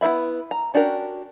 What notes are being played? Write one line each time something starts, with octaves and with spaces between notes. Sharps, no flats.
B3 E4 A#4 E5 B5
A#5
C#4 D4 F#4 G4 A#4